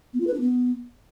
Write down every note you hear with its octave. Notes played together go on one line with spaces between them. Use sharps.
B3
F4
B4
D4
B3